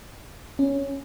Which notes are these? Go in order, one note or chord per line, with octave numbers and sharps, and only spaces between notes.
C#4